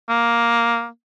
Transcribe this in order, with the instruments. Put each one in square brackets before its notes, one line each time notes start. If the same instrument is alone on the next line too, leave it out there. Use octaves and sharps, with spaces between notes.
[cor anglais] A#3